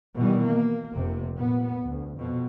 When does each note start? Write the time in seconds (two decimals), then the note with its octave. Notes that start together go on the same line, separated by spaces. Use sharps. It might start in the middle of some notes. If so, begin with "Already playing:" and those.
0.16 B2 D#3 E3 G3
0.45 A#3
0.93 F1 C3
1.36 A#2 B3
1.83 D2
2.17 F2 B2